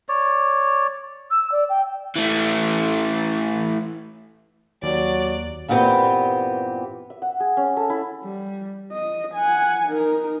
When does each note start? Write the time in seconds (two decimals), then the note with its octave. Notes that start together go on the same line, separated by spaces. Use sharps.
0.09 C#5 D5
1.31 E6
1.52 D5
1.69 G5
2.16 E3 A3
4.83 D#2 F#3 D5
5.69 G2 A#2 E3 B3 C4 G4
7.10 E5
7.22 F#5
7.40 G#4
7.57 C#4
7.77 A4
7.90 E4
8.25 G3
8.93 D#5
9.35 F#5 G#5
9.88 D#4 A#4